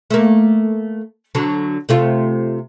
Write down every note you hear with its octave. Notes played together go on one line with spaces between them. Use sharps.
A3 A#3
D3 F#3
C3 A3 F4